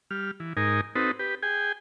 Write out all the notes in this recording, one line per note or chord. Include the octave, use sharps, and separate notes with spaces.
G3 F6
E3
G#2 D#4 A#4 G#5
C4 D#4 F#4 A4 B4
G4 B4
G#4 G5 G#5